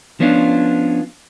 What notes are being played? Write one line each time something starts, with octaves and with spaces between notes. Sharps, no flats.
F3 B3 C#4 D4 F4